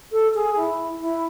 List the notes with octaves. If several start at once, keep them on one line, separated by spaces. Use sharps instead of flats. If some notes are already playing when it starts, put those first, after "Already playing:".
A4
G#4
E4
E4